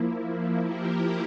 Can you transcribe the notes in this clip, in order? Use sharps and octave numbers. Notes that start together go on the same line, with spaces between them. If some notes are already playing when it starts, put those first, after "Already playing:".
Already playing: F3 A#3 E4
F3 A#3 E4 G4 A#4